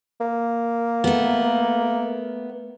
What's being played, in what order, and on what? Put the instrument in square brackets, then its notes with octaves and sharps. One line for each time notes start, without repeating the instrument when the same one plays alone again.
[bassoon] A#3
[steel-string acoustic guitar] A3 B3